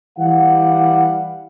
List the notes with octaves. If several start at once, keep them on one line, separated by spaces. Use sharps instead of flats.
E3 G3 F5 F#5